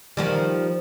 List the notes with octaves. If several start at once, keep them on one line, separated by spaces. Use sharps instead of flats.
D#3 F3 G3